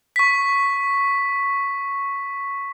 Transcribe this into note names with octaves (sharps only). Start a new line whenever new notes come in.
C#6 B6